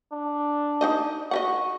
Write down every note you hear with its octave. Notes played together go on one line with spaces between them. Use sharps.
D4
D#4 C5 D#5
F#4 D#5 E5 F#5